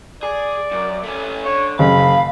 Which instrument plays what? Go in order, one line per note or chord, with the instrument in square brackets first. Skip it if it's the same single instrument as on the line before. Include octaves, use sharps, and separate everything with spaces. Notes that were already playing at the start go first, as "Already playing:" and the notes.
[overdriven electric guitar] G#4 [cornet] D5
[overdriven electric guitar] F#2
A3 C#4
[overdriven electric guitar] D3 [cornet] C#5
[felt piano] F#1 [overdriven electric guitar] F5 [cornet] B5